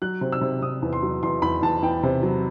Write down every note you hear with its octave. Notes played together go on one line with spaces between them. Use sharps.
F#3 F#6
C3
E6
C3
C3 D#6
E2
C6
F#3
E2 C6
E2 B5
E2 A5
E2 G5
C3
F#3